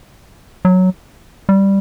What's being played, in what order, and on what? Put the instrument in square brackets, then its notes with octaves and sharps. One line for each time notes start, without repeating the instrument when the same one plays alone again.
[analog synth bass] F#3
G3